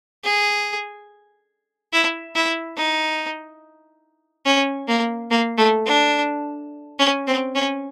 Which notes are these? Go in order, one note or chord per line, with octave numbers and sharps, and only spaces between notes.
G#4
E4
E4
D#4
C#4
A#3
A#3
A3
D4
C#4
C4
C#4